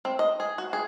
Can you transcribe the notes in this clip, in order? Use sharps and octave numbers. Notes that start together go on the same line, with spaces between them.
C4
D#5
G#4
F#4
G#4